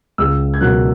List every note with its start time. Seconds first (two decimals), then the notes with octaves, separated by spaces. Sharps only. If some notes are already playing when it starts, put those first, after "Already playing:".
0.18 C#2 E6
0.54 G#6
0.61 B2 F#3 A#3 F#6